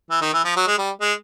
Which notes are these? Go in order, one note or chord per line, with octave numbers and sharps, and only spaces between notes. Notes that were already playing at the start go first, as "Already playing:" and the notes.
E3
D#3
E3
F3
F#3
G#3
G3
G#3